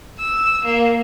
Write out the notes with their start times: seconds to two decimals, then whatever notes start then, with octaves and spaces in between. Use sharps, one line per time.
0.19 E6
0.64 A#3